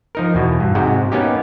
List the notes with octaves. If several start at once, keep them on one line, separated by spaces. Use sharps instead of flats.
F3 D#4 A#4
E2 B2
G2
G#2 C3 G#3 F#4 G5
A#3 B3 C#4 D#4 G4